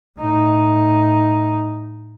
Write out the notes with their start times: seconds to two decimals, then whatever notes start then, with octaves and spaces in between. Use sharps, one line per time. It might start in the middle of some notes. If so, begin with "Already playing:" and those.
0.18 A2 D#4